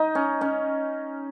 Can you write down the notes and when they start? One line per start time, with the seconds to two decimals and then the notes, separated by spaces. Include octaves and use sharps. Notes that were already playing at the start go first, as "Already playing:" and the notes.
Already playing: D#4
0.15 C#4
0.41 C#4